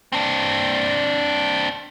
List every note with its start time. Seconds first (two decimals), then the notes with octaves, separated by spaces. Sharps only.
0.12 C4 D4